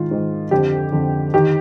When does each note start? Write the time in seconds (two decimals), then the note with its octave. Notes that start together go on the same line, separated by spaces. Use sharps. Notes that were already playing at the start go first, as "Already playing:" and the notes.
Already playing: G#2 D#3 F4
0.11 G#2 D#3
0.51 F2 D3 G4
0.92 F2 D3
1.34 D#3 G4